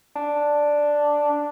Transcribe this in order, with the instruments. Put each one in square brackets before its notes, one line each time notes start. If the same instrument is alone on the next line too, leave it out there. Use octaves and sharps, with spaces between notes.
[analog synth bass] D4